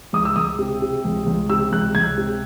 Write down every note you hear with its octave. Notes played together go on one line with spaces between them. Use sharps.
C#2 D#6
E6
C#2 D#6
C3
C3
C#2
C#2
C3 E6
C#2 F#6
C#2 G#6
C3